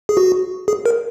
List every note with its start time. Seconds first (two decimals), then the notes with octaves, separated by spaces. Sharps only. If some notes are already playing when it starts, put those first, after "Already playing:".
0.09 G#4
0.17 F#4
0.68 G#4
0.86 A#4